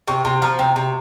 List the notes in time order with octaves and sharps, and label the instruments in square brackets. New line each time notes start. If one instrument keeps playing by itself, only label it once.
[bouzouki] C3 [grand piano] C#6
[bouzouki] C3 [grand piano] C6
[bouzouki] F3 [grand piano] A#5
[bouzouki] C3 [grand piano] A#5
[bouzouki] C3